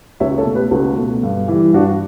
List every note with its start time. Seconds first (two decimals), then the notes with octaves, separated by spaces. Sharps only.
0.20 C#2 C#5 E5
0.38 A4 C#5
0.46 B2 A3
0.55 G4 B4
0.71 C#2 F#4 A4
0.98 B2 A3
1.23 G2
1.48 E3 G3
1.73 G2 D4 F#4